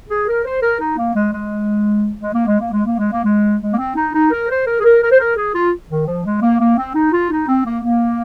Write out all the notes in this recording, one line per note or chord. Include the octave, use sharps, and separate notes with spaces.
G#4
A#4
C5
A#4
D#4
A#3
G#3
G#3
G#3
A#3
G#3
A#3
G#3
A#3
G#3
A#3
G#3
G#3
A#3
C4
D#4
D#4
A#4
C5
A#4
G#4
A#4
A#4
C5
A#4
G#4
F4
D#3
F3
G#3
A#3
A#3
C4
D#4
F4
D#4
C4
A#3
A#3